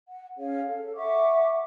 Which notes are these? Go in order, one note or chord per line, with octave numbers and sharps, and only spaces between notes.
F#5
C#4 G#4 C#5 F5
A4
E5 F#5 C#6 D6